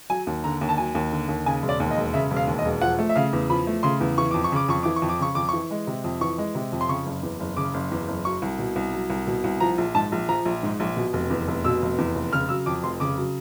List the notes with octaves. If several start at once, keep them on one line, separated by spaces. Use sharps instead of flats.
F#3 G#5
D#2
D3 A#5
D#2
A5
F#3 G#5
D#2
D3
D#2
C#3 G#5
E1
D5
D#2
D#5
E1
C#3 E5
E1
F5
D#2
D#5
E1
F3 F#5
A3
E5
C#3 F5
E2
F3 B5
A3
C#3 C6
E2
E3 C#6
F2 D6
C#6
C#3 D6
F2 C#6
E3 D6
C#6
F2
D6
C#3 C#6
F2 D6
E3 C#6
G#3
C3
F2
E3 C#6
G#3
C3
F2
C6
C#3 C#6
F#1
E2
F#1
C#3 D6
F#1
E2
F#1
F#3 C#6
C2
B2
C2
F#3
C2
B2
C2
F3 A#5
A#1
G#2 A5
A#1
F3 A#5
A#1
G#2
A#1
B2
F1
E2
F1
B2 E6
F1
E2
F1
C#3 F6
F#3 E6
F2 D6
F1 C6
C#3 D6
F#3